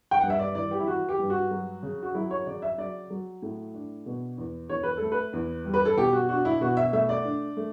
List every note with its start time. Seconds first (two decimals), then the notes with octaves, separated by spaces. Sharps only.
0.11 G5
0.20 G2 F#5
0.30 E5
0.39 D5
0.55 E3 D5
0.71 G4
0.79 E4
0.87 E3 F#4
1.09 G4
1.19 G2
1.30 F#4
1.51 F#3
1.83 C#3
2.03 F#4
2.14 F#3 E4
2.31 C#5
2.46 C#3 D5
2.62 E5
2.78 F#3 D5
3.10 F#3
3.42 A2
3.74 D4
4.06 B2
4.38 E2
4.69 E2 C#5
4.83 B4
4.97 A3 A4
5.12 B4
5.33 E2
5.65 G3
5.74 B4
5.85 A4
5.97 B2 G4
6.13 F#4
6.29 D4 F#4
6.45 E4
6.61 B2 F#4
6.77 E5
6.92 A3 E5
7.09 D5
7.25 D4
7.57 A3